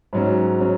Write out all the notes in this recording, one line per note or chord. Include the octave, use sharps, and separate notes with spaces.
G#2 F#3 C#4
F#3 C#4